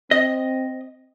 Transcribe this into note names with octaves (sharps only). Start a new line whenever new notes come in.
C4 D#5